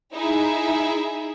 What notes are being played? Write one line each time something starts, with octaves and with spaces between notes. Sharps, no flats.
D#4 E4 G#4 E5